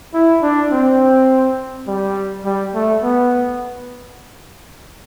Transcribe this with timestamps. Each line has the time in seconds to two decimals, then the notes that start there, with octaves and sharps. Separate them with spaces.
0.14 E4
0.42 D4
0.72 C4
1.87 G3
2.45 G3
2.75 A3
3.03 B3